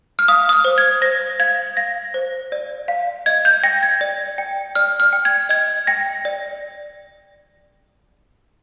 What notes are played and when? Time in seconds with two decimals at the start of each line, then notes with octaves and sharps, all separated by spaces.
0.19 F6
0.28 F5 D#6
0.49 D#6
0.53 F6
0.65 C5
0.78 G#6
1.02 C5 A#6
1.39 F5 G#6
1.77 F5 A#6
2.14 C5
2.52 D5
2.88 F5
3.26 D#5 G#6
3.45 G6
3.63 G5 A#6
3.83 G#6
4.01 D5
4.38 G5
4.75 D5 F6
5.00 F6
5.13 G5
5.25 G#6
5.49 D#5 G#6
5.87 G5 A#6
6.25 D5